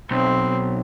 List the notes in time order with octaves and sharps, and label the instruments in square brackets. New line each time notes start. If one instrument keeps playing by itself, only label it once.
[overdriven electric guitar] B1 [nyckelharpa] C4